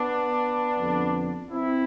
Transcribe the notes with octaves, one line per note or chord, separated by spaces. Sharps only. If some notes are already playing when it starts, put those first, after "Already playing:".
Already playing: B3 D4
F2 D3
C4 E4